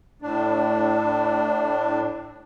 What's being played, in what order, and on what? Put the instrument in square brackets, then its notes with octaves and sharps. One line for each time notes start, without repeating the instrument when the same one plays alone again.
[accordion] A2 D4